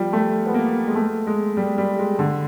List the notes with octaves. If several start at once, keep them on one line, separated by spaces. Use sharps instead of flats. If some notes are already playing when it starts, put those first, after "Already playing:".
Already playing: F3 G3
A3
B3
A#3
G#3
A3
G#3
G3
G3
G#3
D3